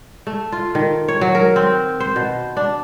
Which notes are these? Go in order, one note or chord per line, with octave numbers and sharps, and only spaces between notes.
A3
F4
D#3
C#5
F#3
A#4
C4
C5
B2
D4